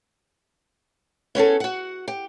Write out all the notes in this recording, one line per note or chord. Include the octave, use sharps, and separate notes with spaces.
B3 C#4 G#4 A4
F#4 F#5
G4